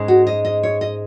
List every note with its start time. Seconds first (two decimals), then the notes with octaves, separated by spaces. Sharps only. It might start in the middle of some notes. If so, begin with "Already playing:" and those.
Already playing: G#2 G#3 C#4
0.08 F#4
0.27 D#5
0.45 D#5
0.63 C#5
0.81 D#5